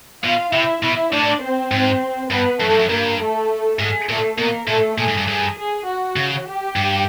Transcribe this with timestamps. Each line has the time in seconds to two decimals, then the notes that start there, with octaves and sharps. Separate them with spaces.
0.23 B2 F4 F5
0.53 C3 E4 E5
0.83 B2 E4 E5
1.12 A2 D4 D5
1.42 C4 C5
1.72 G#2
2.30 G2 B3 B4
2.60 F#2 A3 A4
2.70 G2
2.80 F#2
2.90 G2 A#3 A#4
3.20 A3 A4
3.79 G#2 G#4
4.08 A#2 A3 A4
4.38 B2 A#3 A#4
4.67 A#2 A3 A4
4.98 A#2 G#4
5.08 G#2
5.17 G2
5.27 G2 G#4
5.58 G#4
5.87 F#4
6.16 C#3
6.46 G4
6.76 G2